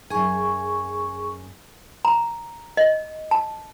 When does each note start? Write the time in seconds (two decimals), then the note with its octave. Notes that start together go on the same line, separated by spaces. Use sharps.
0.10 F#2 G#4 G#5 C#6
2.05 A#5
2.77 D#5
3.31 A5